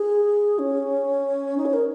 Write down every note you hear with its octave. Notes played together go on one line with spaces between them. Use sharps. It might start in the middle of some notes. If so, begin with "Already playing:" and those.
Already playing: G#4
C#4
D#4
C#5
A#4